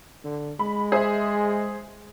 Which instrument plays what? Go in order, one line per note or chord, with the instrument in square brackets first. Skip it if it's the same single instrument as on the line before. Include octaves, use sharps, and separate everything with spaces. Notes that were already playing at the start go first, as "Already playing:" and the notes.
[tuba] D3
[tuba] G#3 [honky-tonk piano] B5
[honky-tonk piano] G#4 C5 E5